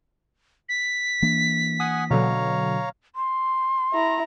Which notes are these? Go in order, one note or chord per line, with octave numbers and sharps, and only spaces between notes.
B6
E3 A#3 D4
F#5 G#5 D#6
B2 D3 F#3 C#5 F5 A#5
C6
E4 A#5